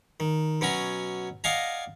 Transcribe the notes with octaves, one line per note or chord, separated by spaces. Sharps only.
D#3
B2 F#3 C#4 G#5 A#5
D5 D#5 F5 F#5 G#5 A#5